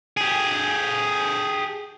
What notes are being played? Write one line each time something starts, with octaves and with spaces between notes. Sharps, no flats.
G4 G#4